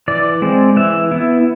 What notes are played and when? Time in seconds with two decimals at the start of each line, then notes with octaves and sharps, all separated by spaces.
0.08 E3 D5
0.42 G#3 C4
0.76 E3 E5
1.11 B3 E4